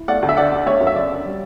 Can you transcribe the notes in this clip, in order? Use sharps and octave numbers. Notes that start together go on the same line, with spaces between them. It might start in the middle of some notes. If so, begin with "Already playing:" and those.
Already playing: E4
A3 D5 F#5
D2
E5
D3 D5 F#5
D4
A3 C#5 E5
F#2
E5
C#3 D5
D4
G3